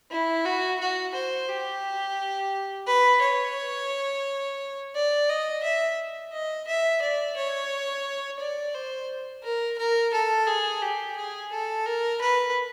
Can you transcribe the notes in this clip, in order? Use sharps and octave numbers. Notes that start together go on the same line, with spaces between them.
E4
F#4
F#4
C5
G4
B4
C#5
D5
D#5
E5
D#5
E5
D5
C#5
D5
C5
A#4
A#4
A4
G#4
G4
G#4
A4
A#4
B4